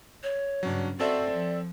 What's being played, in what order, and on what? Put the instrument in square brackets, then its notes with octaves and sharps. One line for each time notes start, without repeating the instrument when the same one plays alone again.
[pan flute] C#5
[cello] G2 C#3 [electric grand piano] F#3 C#4 D4
[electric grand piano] C4 A4 E5 [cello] F#4 C5 [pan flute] D5
[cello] F3